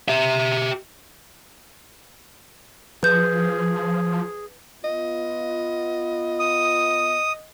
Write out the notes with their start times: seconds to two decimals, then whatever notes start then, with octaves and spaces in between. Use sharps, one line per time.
0.08 G4 E5
3.03 F3 G#4 B4 G6
4.84 B3 F4 D#5
6.40 D#6